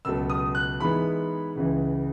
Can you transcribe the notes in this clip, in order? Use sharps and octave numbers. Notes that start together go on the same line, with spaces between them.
C#2 B2 F#3 A3 E6
D#6
F#6
G#2 E3 G#3 B3 B5
C#2 C#3 E3